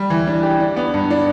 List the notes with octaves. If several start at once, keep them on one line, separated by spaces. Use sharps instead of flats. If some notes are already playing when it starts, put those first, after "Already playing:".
Already playing: G3
E3
D4
G4
D4
B3
G2
D4